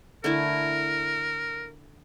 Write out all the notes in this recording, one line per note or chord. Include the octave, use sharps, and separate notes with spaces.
D3 A3 E4 A#4